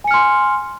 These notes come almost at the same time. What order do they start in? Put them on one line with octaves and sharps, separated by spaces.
G#5 C#7 F6 C6